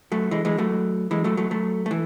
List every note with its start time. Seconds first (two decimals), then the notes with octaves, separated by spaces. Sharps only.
0.12 F#3 A3
0.31 E3 G#3
0.45 E3 G#3
0.58 F#3 A3
1.11 E3 G#3
1.24 F#3 A3
1.37 F#3 A3
1.51 F#3 A3
1.86 A3
1.91 E3